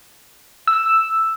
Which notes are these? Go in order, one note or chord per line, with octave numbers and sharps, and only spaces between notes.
E6